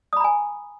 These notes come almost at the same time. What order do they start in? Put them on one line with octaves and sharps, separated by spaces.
D#6 B5 A#5 G#5